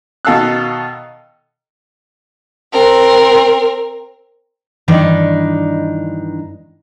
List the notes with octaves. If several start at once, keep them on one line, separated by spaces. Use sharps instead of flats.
B2 D#3 A4 F5 E6 F#6
C4 A#4
G2 D#3 E3 D4 D#4